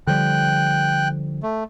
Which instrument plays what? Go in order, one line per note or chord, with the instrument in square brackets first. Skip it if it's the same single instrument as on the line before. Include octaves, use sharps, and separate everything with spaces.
[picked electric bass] D3 F3 G3 [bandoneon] G5 F#6
[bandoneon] A3